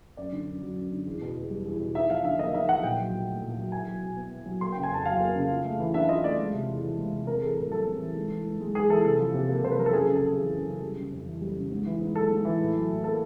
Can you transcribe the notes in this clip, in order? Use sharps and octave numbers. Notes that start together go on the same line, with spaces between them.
F#2 D5
D3
F#2
F#3
F#2
D3
E2
B2
E2
G3
E2
B2
D#4 E5
F3 F5
D3 E5
A#3 D#5
D#4 E5
F3 F#5
A#2 G5
F#3
A#2
A3
A#2
F#3
E4 G#5
F#3
B2
B3
E4
F#3
A#3 C6
C#3 G5
G#5
F2 A5
F#3 F5
A#3
C#3
F4
A3
E3
D4 E5
F4 D#5
A3 D5
G#3
C3
E2
E3
G#3
C3
C4 A#4
G#4
E3 A4
A2 A#4
G3 A4
C4
E3
G#2
E3
G#2
G#3
G#2 G#4
E3 A4
C3 A4
F3
C3
A#3
C3 C5
B4
F3 A#4
A4
F#2 G#4
A4
C#3
A4
F#2 G#4
E3
F#2
C#3
G3
C#3
F2
E3
G3
C#3
G#2
E3
G#2
G#3 A4
G#2
E3
A2
F#3
A2
A#3 A4